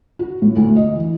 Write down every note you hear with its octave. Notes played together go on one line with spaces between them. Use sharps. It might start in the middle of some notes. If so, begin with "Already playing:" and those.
F#4
A2
D2
D#5
E3